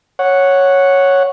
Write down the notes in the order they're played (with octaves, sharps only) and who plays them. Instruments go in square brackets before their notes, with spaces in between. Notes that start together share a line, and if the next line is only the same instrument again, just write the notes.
[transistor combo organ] C#5 F#5